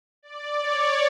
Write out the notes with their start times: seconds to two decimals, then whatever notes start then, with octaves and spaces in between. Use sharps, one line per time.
0.23 D5
0.60 C#5